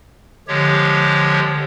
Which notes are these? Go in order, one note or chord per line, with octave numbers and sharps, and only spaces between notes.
D3 F3 G#3 G4 C#5